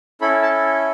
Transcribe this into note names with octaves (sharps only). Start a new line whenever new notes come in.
C#4 E4 A4 B5
A5